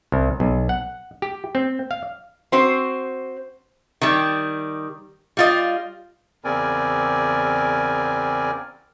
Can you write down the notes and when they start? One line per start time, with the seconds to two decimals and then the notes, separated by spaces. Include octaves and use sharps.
0.12 C2
0.40 B1
0.69 F#5
1.22 G4
1.55 C4
1.91 F5
2.52 C4 F#4 C5
4.01 D#3 G3
5.37 G3 F4 D#5
6.44 E2 C#3 C4 A#4 D5 G#5